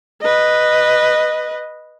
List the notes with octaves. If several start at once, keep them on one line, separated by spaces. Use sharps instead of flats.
B4 D#5